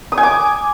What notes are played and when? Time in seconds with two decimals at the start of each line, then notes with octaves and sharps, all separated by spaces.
0.12 D#6
0.18 G#5
0.23 D6